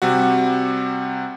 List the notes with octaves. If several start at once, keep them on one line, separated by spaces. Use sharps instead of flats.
C3 G3 F#4